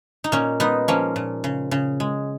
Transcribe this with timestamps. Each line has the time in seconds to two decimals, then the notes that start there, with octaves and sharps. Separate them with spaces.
0.24 D#4
0.32 A#2 A#3 C#4
0.60 G#3 B3 D#4
0.88 F3 A#3 C#4
1.16 A#2
1.44 C#3
1.71 C#3
2.00 G#3